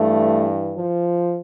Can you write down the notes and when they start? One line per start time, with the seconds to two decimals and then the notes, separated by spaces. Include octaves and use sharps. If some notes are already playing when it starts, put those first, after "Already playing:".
Already playing: G2 E3 A3
0.77 F3